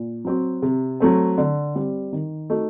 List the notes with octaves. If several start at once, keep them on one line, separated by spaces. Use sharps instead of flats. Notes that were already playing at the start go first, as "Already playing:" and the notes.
Already playing: A#2
F#3 C4 F#4
C3
F#3 A3 C4
D3
G3 C4
D#3
A3 D#4 F#4